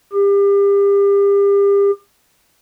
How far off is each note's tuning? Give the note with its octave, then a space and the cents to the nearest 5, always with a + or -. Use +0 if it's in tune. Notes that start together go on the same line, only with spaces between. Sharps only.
G4 +35